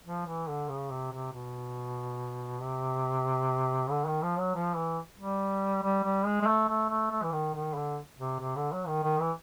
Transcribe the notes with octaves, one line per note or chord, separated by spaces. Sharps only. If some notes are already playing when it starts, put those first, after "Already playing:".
F3
E3
D3
C#3
C3
C3
B2
C3
D3
D#3
F3
F#3
F3
E3
G3
G3
G3
G#3
G#3
A3
A3
A3
A3
E3
D#3
D#3
D3
C3
C3
D3
F#3
D#3
D#3
E3